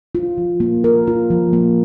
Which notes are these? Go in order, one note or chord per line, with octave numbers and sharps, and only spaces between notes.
F4
F3
A#3
A#4
F4
F3
A#3